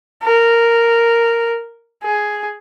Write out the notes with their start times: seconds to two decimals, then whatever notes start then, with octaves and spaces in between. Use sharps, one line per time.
0.24 A#4
2.03 G#4